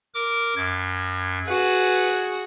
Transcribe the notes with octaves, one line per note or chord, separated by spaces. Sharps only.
A#4 D6
F#2 G#6
F#4 G#4 B4